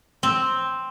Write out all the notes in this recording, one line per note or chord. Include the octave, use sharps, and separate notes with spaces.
C4